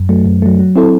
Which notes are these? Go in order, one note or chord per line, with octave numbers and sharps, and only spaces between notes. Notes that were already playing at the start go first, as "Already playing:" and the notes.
Already playing: F#2
F#3 A3
F#2
F#3 A3
F#3
C4 E4 A4